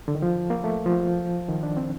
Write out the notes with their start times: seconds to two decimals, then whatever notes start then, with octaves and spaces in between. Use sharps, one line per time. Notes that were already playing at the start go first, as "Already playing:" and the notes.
0.08 D3
0.15 D#3
0.22 F3
0.50 A#3
0.64 A3
0.86 F3
1.48 D#3
1.63 D4
1.77 C4